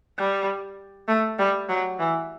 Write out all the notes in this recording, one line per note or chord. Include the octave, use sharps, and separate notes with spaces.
G3
A3
G3
F#3
E3